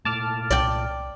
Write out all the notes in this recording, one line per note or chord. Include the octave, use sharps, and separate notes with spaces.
A#2 A3 A5 D6 F6
C2 D5 G5